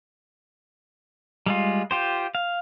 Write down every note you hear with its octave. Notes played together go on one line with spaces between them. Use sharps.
G3 G#3 F4
F4 G4 C5
F5